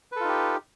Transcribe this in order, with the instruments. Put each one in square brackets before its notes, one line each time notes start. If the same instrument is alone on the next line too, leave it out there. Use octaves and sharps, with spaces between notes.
[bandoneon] B4
A4
F4
D#4
G4